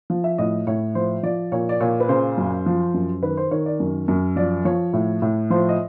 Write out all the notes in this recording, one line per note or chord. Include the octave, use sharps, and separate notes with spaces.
F3
E5
A2 D#5
A2 C#5
F3 C5
F3 D5
A#2 C#5
D5
A#2 C#5
B4
C#3 C5
F#2
F3
F#2
D#3 B4
C5
D#3 C#5
D5
F#2
F#2
F3 D5
F3 C#5
A2
A2
F3 C5
D#5